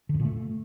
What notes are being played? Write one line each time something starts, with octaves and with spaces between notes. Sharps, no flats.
D3
F#2
A#2
A3